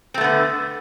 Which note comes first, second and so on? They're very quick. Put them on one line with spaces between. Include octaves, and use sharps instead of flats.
C4 A3 B3 D3